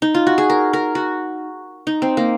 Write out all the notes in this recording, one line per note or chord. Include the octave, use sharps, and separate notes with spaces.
D#4
F4
F#4
G#4
A#4
A#4
F#4
D#4
C4
A#3